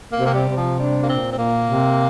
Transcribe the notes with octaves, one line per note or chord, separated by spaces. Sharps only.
A#3
C3
A#3
G3
C3
F3
G3 D4
A#3
A#2 C4
C4
A#2 A#3
C3